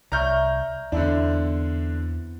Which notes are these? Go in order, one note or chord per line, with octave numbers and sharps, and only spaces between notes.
C2 D5 E5 A#5 C#6 F6 G6
E2 D3 B3 C4 D4 E4